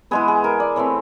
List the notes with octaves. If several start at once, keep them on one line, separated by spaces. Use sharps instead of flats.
E3 G#3 B3 G#4
G#4
A#4
D5
E3 A3 C4 C#5